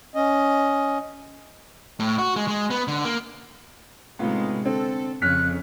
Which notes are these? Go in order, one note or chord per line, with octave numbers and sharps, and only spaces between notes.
C#4 D#5
A2
F#4
G#3
G#3
B3
D3
A#3
A2 C3 G#3 B3 D#4 F4
D3 C4 A4
F2 C#3 C#4 F6 F#6 B6